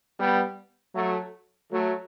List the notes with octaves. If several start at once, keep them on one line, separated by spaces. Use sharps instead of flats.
G3 B3
F#3 A3
F#3 A3